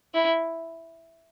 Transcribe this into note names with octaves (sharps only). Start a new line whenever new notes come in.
E4